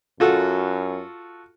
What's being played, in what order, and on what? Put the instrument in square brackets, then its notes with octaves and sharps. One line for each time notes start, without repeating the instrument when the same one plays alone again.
[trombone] F#2 [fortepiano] F4 F#4 A4